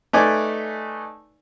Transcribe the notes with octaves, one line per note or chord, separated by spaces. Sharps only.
A3 D#4 B4 D5 G#5